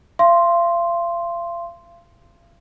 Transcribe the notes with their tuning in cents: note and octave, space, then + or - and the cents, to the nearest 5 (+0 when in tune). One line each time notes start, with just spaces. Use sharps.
F5 -40 C6 +0